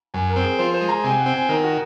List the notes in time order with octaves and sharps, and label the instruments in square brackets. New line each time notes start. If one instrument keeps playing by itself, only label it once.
[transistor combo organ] F#2 [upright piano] G#5
[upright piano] A#4
[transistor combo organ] C4
[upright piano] G#4
[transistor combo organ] F3 [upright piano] C5
[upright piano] C5
[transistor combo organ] G#3
[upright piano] A#5
[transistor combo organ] C3 [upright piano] G#5
[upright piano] F#5
[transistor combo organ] C4
[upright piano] G#5
[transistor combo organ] D#3 [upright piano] A#4
[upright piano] F#4